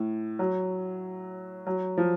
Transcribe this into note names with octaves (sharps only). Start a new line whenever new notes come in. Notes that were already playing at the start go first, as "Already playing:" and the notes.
Already playing: A2
F#3
F#3
F3